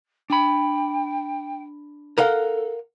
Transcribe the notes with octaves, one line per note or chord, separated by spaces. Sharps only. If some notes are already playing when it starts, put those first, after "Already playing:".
D4 G5 B5
A4 A#4 F5 F#5